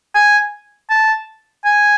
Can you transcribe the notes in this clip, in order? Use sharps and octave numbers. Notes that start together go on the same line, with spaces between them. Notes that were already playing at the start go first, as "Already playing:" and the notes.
G#5
A5
G#5